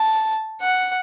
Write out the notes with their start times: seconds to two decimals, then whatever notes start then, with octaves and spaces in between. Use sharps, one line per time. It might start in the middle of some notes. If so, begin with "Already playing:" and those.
Already playing: A5
0.61 F#5